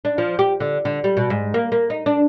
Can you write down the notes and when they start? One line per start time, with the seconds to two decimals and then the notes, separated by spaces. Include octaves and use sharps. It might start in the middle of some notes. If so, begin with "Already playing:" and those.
0.05 D4
0.18 F3
0.39 G4
0.60 D3
0.85 D3
1.04 G3
1.17 B2
1.30 G#2
1.54 A#3
1.72 A#3
1.90 D#4
2.06 D4